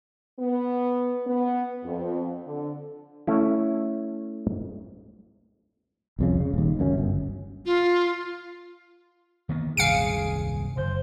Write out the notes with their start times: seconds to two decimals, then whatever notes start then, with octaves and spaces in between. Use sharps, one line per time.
0.39 B3
1.26 B3
1.84 F2
2.45 D3
3.27 A3 C#4 E4
6.19 C2 F2 C#3
6.40 C#3
6.54 D#1 D#2
6.79 C#2 F#2 A#3 C#4
6.98 G1
7.66 F4
9.49 D#3 A#3 B3
9.77 D#1 C2 F#2 G#4 F5 C#7 D7
10.77 F#1 C5